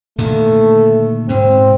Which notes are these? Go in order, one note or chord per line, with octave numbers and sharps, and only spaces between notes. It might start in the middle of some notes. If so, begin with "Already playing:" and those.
A#2 D3 D#3 A3
G#2 B2 C4